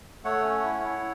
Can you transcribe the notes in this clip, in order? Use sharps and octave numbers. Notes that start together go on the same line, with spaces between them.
A3 C#5 F#5
C#4
E4
E4